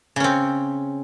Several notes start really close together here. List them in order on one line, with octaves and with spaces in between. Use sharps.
C#3 C#4 C4